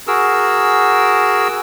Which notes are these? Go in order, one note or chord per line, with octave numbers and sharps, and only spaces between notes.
F#4 G#4 A#4 E6